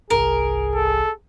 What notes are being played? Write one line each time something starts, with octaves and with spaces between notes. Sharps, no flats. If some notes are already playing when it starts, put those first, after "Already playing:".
G1 C2 G#4 A#4
A4